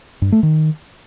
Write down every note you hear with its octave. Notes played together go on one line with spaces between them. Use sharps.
G2
A3
D#3